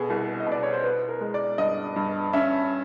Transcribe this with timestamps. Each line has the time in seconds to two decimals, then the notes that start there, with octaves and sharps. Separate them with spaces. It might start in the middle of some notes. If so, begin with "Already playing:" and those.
Already playing: B2 B3 G#4 A4
0.10 C2
0.40 D#5
0.46 B2
0.52 D5
0.63 C#5
0.73 C5
0.84 B3 B4
1.09 A#4
1.21 G#3
1.34 D5
1.58 G2 D#5
1.96 G2
2.33 C#4 E5